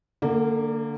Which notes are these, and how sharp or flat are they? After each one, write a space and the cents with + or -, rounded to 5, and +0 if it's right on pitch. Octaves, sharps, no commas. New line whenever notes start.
D3 +10 A#3 -20